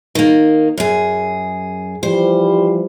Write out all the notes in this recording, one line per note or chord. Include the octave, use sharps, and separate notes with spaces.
D#3 A#3
F#2 G#4
E3 F3 G3 C5